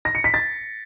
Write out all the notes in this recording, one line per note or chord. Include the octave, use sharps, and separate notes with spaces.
A#6
C#7
B6
A6